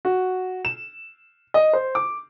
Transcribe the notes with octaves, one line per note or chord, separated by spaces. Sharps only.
F#4
E7
D#5
C5
D6